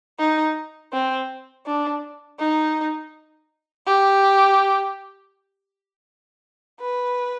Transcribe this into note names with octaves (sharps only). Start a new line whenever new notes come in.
D#4
C4
D4
D#4
G4
B4